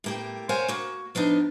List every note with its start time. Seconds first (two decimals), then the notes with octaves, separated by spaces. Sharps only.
0.04 A2 A#3 G4
0.49 A#4 C5 C#5 F5 F#5 G#5
0.68 A#3 F#4
1.15 F3 B3 D4 D#4